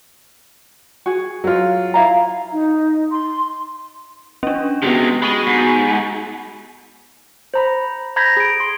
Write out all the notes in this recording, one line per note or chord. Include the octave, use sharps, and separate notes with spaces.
F#4 G#4
F#3 F4
E4 F5 A#5
D#4
C6
C#4 D4 D#5
C3 G#3 B3 F#4 G4
G#3 B5 C#6 D#7
G#2
C5 A#5 B5
A#5 B5 G6 G#6 A#6 B6
G#4 D7
C6